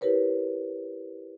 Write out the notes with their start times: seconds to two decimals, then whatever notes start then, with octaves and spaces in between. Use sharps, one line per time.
0.01 E4 G4 A#4 B4 C#5